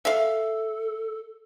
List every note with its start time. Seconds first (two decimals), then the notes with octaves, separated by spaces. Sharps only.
0.05 A4 E5 F5